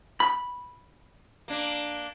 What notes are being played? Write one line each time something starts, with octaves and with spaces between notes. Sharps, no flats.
B5
A#3 D4